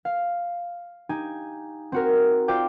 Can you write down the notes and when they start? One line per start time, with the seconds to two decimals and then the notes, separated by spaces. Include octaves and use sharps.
0.05 F5
1.09 D#4 G4 G#5
1.92 C4 F#4 A#4
2.48 F4 C5 D5 G5 D6